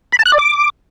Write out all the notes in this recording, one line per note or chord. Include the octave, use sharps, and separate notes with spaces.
B5
A5
F#6
D5
D6